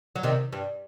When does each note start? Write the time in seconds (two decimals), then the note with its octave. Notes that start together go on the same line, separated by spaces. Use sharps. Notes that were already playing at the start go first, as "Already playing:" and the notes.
0.16 F#3
0.23 C3 D#3
0.53 G2